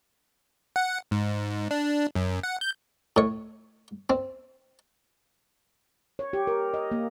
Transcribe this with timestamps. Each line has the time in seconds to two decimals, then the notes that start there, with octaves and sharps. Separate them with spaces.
0.76 F#5
1.11 G#2
1.71 D4
2.15 F#2
2.43 F#5
2.61 G6
3.17 A2 C#5
4.10 C4
6.19 C#5
6.33 G4
6.47 A#4
6.74 D#5
6.91 A#3